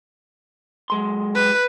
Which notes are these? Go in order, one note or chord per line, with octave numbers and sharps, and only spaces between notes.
F#3 G#3 C6
B4